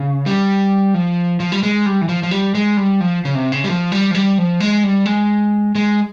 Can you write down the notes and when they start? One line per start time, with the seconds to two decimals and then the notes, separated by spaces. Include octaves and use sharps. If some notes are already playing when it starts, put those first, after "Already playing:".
Already playing: C#3
0.26 G3
0.94 F3
1.40 F3
1.52 G3
1.63 G#3
1.86 G3
2.01 E3
2.09 F3
2.23 F3
2.31 G3
2.55 G#3
2.77 G3
3.01 F3
3.25 C#3
3.35 C3
3.52 C#3
3.64 G3
3.69 F3
3.92 G3
4.11 F3
4.15 G3
4.38 F3
4.60 G#3
4.84 G3
5.06 G#3
5.75 G#3